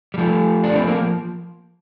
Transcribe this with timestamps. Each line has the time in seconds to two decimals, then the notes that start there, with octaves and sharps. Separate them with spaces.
0.14 G3
0.18 F3 A3
0.64 D4
0.76 C4
0.87 A#3